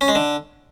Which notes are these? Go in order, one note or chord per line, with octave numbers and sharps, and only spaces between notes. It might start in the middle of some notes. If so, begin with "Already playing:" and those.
C#4
G#3
D3